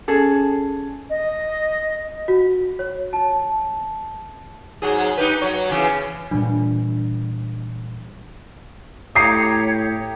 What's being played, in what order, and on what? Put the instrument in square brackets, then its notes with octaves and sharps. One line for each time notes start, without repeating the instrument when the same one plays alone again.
[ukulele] C#4 G#4 A4
[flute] D#5
[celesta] F#4
C#5
A5
[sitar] G#2 F#3 G#4
D#4 G4 B4
F#3 C#5
C#3 E3
[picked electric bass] A#2 E3 G3 [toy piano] D4
[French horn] A2 [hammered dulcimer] G4 A#5 [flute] C#5 [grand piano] D#6 C7